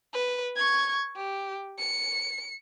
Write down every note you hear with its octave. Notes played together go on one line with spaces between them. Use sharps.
B4
C#6 G#6
G4
C#7